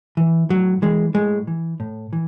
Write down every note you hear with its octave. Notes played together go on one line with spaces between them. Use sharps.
E3
A2 F#3
E3 G#3
A2 G#3
E3
A2
E3